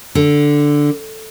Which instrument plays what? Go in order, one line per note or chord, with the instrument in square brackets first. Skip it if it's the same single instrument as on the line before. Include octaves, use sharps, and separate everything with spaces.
[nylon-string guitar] D3